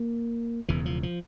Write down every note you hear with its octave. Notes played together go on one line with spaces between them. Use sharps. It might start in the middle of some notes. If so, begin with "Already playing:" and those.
Already playing: A#3
E1 E2 C#3 E3
F3
F3